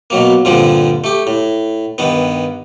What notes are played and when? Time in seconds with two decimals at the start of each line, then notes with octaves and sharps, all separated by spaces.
0.10 B2 F#3 A#3
0.45 G2 A#2 D3 F3 G3 C4
1.04 A3 G4
1.27 A2
1.98 G2 D#3 B3